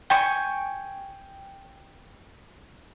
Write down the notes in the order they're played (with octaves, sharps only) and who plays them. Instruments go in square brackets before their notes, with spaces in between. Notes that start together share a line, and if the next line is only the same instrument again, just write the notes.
[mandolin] G5 G#5 C#6